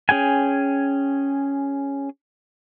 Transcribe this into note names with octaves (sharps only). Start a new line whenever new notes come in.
C#4 G#4 G5 G#5